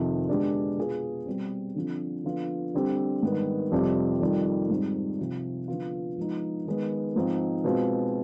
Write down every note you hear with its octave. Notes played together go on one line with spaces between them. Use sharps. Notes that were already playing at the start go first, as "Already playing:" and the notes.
Already playing: F2 C3 D#3
D3 G#3 B3 D4 G4
B2 B3 F4 G#4
B2 G3 C4
D3 F3 C4
D3 F3 B3 F4
D3 G3 C4 G4
G#2 D#3 G3 B3
F2 C3 G3 C4 G4
F2 D#3 G3
G#2 G3 C4 D#4
C3 F3 C4
D3 F3 B3 F4
F3 G#3 B3 D#4
D#3 G#3 B3
G#2 F3 C4 D#4
B2 G#3 C4 F4